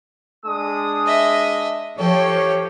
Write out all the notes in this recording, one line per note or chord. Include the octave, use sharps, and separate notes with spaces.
G#3 D4 D#6
D#5 E5
F3 G4 A4 C#5 G5